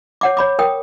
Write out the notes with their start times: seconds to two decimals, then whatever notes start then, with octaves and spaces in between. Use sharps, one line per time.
0.21 C#5 F#5 D6
0.37 C#5 B5 D6
0.59 A#4 G5 D#6